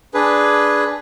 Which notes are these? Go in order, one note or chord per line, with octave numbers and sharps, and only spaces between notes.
D4 G#4 B4